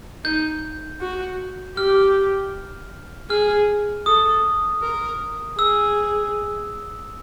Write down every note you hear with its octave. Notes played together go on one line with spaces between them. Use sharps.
D#4 G6
F#4
G4 F6
G#4 F6
A4 D#6
A#4
G#4 E6